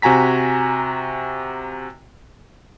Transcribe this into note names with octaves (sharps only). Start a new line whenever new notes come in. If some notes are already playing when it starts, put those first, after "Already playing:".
C3 F#4 G#5 A#5 B6